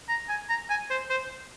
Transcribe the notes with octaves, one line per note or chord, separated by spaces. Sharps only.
A#5
G#5
A#5
G#5
C5
C5